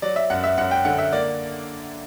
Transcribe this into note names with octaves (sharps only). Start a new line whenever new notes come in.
F#3 D5
E5
F#2 F#5
E5
F#2 F#5
G5
D3 F#5
E5
A#3 D5